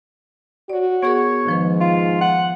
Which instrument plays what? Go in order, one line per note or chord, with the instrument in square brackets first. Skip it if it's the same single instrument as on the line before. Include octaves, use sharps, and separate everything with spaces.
[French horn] F#4 [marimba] C#5 D5
[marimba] B3 G#4 A#4 [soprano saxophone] C#5
[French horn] G#2 [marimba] D#3 F3 B4
[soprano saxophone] F4
F#5